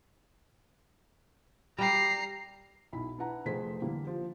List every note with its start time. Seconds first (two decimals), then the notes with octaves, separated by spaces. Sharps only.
1.78 G3 G4 A#5 C7
2.93 B1 E4 B5
3.18 D4 E4 B4 F#5 A#5
3.46 F1 F2 A3 G#4 C5 B6
3.82 D3 E3 G3 A#3
4.07 F3